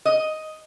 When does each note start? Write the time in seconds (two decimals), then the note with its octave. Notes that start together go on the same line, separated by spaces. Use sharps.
0.05 D#5